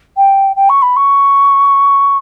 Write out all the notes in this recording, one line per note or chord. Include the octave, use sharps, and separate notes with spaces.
G5
G5
C#6
B5
C#6